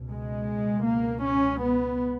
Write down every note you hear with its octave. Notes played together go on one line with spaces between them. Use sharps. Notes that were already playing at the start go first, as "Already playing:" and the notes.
Already playing: C#2 B2
G#3
A#3
C#4
B3